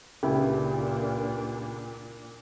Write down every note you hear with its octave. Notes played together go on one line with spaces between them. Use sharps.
C#2 A#2 D4 E4 G4